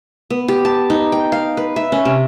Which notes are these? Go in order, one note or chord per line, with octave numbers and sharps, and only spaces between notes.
B3
G4
A5
D#4
G5
F5
B4
E5
C#4
C3